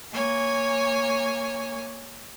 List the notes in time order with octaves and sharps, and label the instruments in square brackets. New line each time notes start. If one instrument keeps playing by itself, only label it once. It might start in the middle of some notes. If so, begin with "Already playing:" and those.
[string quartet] A#3 C#5 G#5